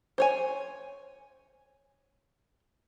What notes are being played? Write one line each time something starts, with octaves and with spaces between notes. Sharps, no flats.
C5 C#5 G#5